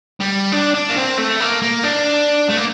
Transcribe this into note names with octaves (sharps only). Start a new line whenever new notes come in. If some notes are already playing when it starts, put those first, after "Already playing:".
G3
D4
D4
A#3
C4
A3
A#3
A#3
D4
A3
A#3